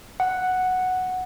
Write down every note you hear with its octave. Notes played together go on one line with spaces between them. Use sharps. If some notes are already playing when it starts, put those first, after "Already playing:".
F#5